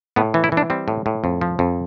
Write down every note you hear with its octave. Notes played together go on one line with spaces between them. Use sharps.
A2 B3
E3
E4
E3
D4
G3 C4
A2
A2
F2
F3
F2